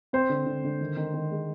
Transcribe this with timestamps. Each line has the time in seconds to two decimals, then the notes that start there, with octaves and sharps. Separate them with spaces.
0.13 C4 C5
0.29 D3
0.46 D3
0.64 D3
0.81 D#3
0.97 D#3
1.13 D#3
1.31 G#3